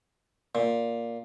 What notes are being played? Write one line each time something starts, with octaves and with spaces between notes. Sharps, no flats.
A#2